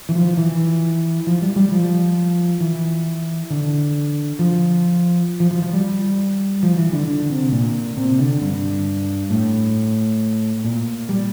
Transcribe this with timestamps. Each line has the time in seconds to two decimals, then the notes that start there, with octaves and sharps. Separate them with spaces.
0.09 E3
0.15 F3
0.37 E3
1.27 F3
1.42 G3
1.56 G3
1.72 F3
2.61 E3
3.50 D3
4.39 F3
5.40 F3
5.51 F3
5.62 F3
5.73 G3
6.63 F3
6.77 E3
6.93 D3
7.07 D3
7.30 C3
7.52 A#2
7.97 C3
8.19 D3
8.41 G2
9.31 A2
10.64 A#2
11.09 G3